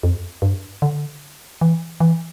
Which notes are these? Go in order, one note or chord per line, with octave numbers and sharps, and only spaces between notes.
F2
G2
D3
E3
E3